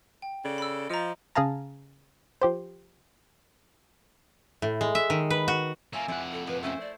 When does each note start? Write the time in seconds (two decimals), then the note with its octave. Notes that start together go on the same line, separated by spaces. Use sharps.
0.22 G5
0.44 C#3 A4 D5
0.58 B5 E6
0.90 F3 D#5 A#5
1.35 C#3 G#4 F5 A5 A#5
2.42 F3 G4 C5
4.62 A2
4.81 G#3
4.95 E5
5.10 D#3
5.30 B4
5.48 F#4
5.93 A#3 C#4 F4 E5 G#5
6.08 F2 E4 C5 D5 F#5
6.32 A4
6.47 A#2 F3 B4 G#5
6.63 A3 C#4 E4 C5
6.80 D5